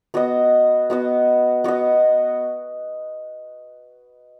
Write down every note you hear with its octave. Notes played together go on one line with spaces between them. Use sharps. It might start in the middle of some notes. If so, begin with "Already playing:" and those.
B3 F#4 D#5
B3 F#4 D#5
B3 F#4 D#5